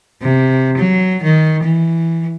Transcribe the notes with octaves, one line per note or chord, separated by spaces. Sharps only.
C3
F#3
D#3
E3